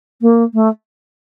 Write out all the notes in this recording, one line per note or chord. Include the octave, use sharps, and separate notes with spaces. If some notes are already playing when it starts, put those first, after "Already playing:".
A#3
A3